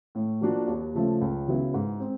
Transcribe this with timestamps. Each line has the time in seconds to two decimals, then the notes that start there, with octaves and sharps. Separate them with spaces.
0.15 A2
0.41 F3 A#3 D4 F#4
0.68 D#2
0.94 C#3 F3 A3
1.21 C#2
1.47 C#3 F#3 B3 E4
1.74 G#2
2.00 C4